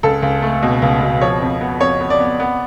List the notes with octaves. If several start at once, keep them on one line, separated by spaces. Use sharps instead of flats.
C#2 A4
C#2
A3
B2
C#2
B2
F3 C#5
F2
B3
F2 C#5
B3
D5
B3
B3